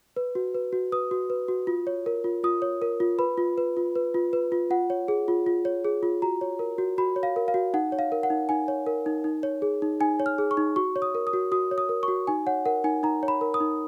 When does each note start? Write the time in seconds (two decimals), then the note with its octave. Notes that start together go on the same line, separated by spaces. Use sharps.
0.16 B4
0.35 F#4
0.55 B4
0.73 F#4
0.92 B4 D#6
1.11 F#4
1.30 B4
1.48 F#4
1.67 F4
1.87 C#5
2.06 A#4
2.24 F4
2.44 F4 D#6
2.62 C#5
2.82 A#4
3.00 F4
3.19 B4 B5
3.38 F4
3.58 B4
3.77 F4
3.95 B4
4.14 F4
4.33 B4
4.52 F4
4.70 F4 F#5
4.90 C#5
5.08 G#4
5.28 F4
5.46 F4
5.65 C#5
5.84 G#4
6.03 F4
6.22 F#4 A#5
6.41 C#5
6.59 A#4
6.78 F#4
6.98 F#4 B5
7.16 C#5
7.23 F5
7.36 A#4
7.48 F5
7.54 F#4
7.74 D#4 F#5
7.92 C#5
7.99 F5
8.12 A#4
8.23 F#5
8.30 D#4
8.49 D#4 G#5
8.68 C#5
8.86 A#4
9.06 D#4
9.24 D#4
9.43 C#5
9.62 G#4
9.82 D#4
10.00 D#4 G#5
10.20 C#5
10.26 F6
10.38 G#4
10.51 C#6
10.57 D#4
10.76 F#4 C#6
10.96 C#5
11.02 D#6
11.15 A#4
11.27 D#6
11.33 F#4
11.52 F#4 D#6
11.71 C#5
11.78 D#6
11.89 A#4
12.03 C#6
12.08 F#4
12.27 D#4 G#5
12.47 C#5 F#5
12.66 A#4 F#5
12.84 D#4 G#5
13.03 D#4 A#5
13.23 C#5
13.28 B5
13.41 A#4
13.54 D#6
13.60 D#4